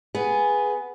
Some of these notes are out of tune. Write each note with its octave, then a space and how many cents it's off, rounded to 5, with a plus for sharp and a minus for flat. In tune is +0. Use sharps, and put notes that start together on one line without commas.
B3 +0 G#4 +0